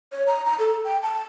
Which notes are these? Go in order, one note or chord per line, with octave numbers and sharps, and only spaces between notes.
C#5
A#5
A#5
A4
G5
A5